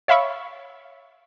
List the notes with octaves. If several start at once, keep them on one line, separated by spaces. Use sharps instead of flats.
C#5 E5 F5 B5 C#6